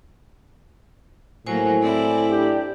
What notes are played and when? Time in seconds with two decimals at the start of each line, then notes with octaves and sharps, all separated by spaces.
1.46 A2 F#3 A#3 C5 G#5
1.82 C4 E4 D5
2.31 D4 G4